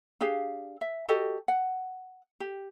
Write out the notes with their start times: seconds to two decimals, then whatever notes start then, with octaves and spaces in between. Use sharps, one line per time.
0.21 D4 G4 G#4 F5
0.81 E5
1.08 F#4 G4 A4 D#5
1.48 F#5
2.40 G4